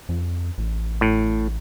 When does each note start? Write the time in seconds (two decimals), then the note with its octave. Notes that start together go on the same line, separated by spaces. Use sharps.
0.09 F2
0.58 A1
1.01 A2